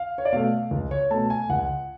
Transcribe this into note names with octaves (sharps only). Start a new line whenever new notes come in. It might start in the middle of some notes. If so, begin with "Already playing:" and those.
Already playing: F5
C#5
D5
B2 A3 F5
C#2
C#5
B2 A3 A5
G#5
C#2 F#5